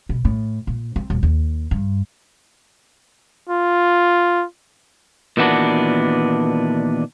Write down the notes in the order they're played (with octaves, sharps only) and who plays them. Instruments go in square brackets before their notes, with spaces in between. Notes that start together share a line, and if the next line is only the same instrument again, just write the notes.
[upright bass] B2
A2
A#2
C4
D#1
D#2
G2
[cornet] F4
[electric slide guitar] A#2 D#3 E3 B3 D4 F#4